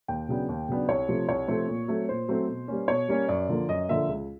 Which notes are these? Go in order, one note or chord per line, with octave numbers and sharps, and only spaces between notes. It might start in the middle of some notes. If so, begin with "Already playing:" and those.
D#2 G5
C#3 F#3 B3 D4
D#2
C#3 F#3 B3 D4
C2 C#5
C3 F3 A3 C4
C2 C#5
C3 F3 A3 C4
A#2
F#3 A3 C4
A#2 C5
F#3 A3 C4
B2
G3 A#3 C#4
B2 C#5
G3 A#3 C#4
F#2 D5
D3 F3 A#3
F#2 D#5
D3 F3 A#3 E5
C#2